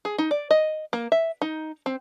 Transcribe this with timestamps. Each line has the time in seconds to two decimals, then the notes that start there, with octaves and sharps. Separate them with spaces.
0.05 G#4
0.18 D#4
0.31 D5
0.51 D#5
0.93 A#3
1.12 E5
1.42 D#4
1.86 C4